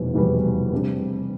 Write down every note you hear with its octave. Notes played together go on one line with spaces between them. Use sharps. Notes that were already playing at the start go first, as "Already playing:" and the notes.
Already playing: F1 E2 B2 G3
F1 E2 B2 G3 B3
C3 G3 D4